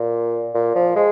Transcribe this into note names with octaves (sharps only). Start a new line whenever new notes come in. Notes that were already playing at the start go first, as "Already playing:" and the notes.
Already playing: A#2
A#2
F3
G#3